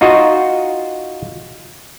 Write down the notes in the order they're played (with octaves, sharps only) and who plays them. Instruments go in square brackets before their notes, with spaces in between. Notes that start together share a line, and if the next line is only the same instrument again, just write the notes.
[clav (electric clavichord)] D#4 F4 F#4 D#5